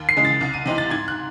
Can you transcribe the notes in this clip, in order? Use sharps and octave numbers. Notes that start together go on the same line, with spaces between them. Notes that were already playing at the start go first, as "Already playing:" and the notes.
Already playing: D#2
C7
C#3 E3 G#3
A6
C2
D#7
C3 E3 C4 D#4 D#7
A6
G#2 G#6
F#6